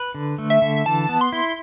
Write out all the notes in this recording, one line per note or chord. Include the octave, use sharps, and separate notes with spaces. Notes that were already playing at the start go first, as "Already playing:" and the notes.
Already playing: B4
D3
A3
E5
D3
E3 A5
B3
C6
E4